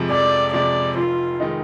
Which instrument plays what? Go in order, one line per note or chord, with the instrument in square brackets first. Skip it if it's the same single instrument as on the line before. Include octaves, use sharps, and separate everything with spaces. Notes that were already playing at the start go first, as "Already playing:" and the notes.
Already playing: [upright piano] F2 C3 F3 G#3
[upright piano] F2 [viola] D5
[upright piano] C3 F3 G#3 [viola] D5
[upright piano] F1 [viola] F4
[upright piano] D#3 G#3 D#4